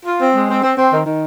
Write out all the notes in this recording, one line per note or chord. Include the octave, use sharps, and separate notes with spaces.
F4
C4
G#3
C4
C4
C4
D#3
D#3